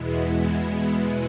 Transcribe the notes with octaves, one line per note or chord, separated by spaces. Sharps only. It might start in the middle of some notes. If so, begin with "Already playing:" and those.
Already playing: E2 B2 G#3 B3 E4